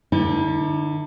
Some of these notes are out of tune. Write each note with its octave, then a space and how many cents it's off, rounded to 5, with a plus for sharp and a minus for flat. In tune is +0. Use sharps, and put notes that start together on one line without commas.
D3 +25 E4 -40